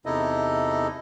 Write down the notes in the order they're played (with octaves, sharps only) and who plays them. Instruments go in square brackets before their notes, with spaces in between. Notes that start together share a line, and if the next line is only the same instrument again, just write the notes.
[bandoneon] E2 C3 D#4 E4 A4 D#5